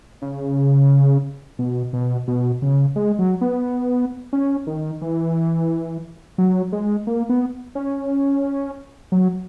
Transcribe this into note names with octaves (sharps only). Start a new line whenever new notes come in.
C#3
B2
B2
B2
C#3
G#3
F#3
B3
C#4
D#3
E3
F#3
G#3
A#3
B3
C#4
F#3